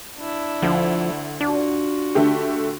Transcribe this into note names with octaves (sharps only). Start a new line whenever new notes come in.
D4 E4
D2 F3
D4 F4 F#4
D3 A3 G4